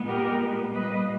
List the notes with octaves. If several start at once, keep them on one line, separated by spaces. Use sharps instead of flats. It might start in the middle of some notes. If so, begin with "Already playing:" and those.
Already playing: A#2 G#3 B3
G4 A#4
A#2 G3 A#3 B4 D#5